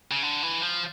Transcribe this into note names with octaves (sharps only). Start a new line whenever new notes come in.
C#3
D3
E3
F3